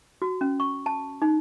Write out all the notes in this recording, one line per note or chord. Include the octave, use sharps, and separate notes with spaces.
F#4
C#4
C#6
A5
D#4